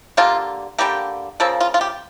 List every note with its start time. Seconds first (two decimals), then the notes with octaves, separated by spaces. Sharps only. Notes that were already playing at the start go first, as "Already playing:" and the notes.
0.17 D3 G3 A#3 F4
0.78 D3 G3 A#3 G4
1.40 C#3 F3 A#3 A4
1.60 F4
1.74 F4
1.81 G4